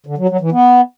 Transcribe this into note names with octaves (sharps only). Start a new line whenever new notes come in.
D3
F#3
F#3
E3
B3